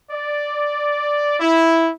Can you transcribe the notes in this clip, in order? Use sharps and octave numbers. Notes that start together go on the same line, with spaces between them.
D5
E4